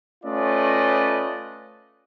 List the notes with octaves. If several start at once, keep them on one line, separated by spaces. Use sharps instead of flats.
A3 C#4 F4 B4 D5 D#5